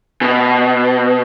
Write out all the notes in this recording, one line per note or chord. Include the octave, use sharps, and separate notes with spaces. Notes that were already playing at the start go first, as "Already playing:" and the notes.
B2